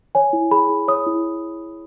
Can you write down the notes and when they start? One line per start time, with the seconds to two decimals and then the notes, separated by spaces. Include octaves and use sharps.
0.15 C#5 G#5
0.33 E4
0.51 G#4 B5
0.69 E4
0.88 C#5 D#6
1.06 E4